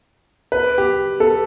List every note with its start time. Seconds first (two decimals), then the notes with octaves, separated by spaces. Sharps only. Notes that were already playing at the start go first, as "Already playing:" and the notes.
0.52 B4
0.78 G4
1.20 A4